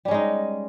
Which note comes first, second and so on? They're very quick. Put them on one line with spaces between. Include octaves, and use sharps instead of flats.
G3 C#4 G#3 D#4